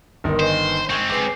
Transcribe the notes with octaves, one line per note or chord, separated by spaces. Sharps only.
G1 D#3 A#4 C6 D#6
B4 C5 D#5 G#5
G#3 C4 G#5 C#6 G#6
G#4 B4 G#5 D6 C7